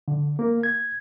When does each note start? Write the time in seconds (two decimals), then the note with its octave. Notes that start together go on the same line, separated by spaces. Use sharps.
0.08 D3
0.39 A#3
0.63 G#6